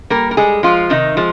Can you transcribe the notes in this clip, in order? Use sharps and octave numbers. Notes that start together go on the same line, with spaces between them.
G3 A#3 A#4
A#4
G3 G#3 G#4
F3 G#3 F4
C3 D#3 D#4
F3 G#3